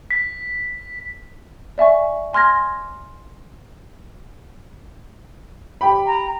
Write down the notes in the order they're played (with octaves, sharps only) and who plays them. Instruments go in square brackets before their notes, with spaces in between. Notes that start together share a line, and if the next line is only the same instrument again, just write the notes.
[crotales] B6
[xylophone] D5 E5 G#5 C#6
G#5 C6 F6 G#6 A#6
[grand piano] G4 G5 B5
[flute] A#5